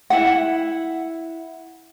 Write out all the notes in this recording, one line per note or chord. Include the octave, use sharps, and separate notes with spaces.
E4 F#5